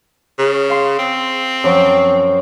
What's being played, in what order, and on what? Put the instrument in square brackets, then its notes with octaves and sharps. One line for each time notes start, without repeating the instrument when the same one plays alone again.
[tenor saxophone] C#3
[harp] F5 C6
[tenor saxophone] C4
[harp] F#2 F3 C#6